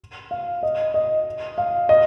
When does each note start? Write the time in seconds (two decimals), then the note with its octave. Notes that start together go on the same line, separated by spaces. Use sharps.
0.31 F5
0.63 D#5
0.94 D#5
1.58 F5
1.89 D#5